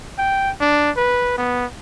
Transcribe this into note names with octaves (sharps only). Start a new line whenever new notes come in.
G5
D4
B4
B3